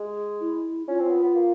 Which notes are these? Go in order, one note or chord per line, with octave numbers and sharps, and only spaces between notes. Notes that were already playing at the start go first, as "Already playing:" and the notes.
Already playing: G#3
E4
C#4 F4
C4
B3
B3
A#3